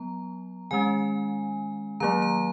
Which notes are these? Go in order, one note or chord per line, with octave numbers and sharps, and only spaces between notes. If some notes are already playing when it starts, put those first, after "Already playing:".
Already playing: F#3 B3 A#5
D#3 G#3 C#4 G#5
D#3 F#3 A#3 A#5
A#5